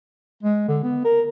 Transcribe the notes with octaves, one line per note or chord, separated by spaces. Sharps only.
G#3
D3
B3
A#4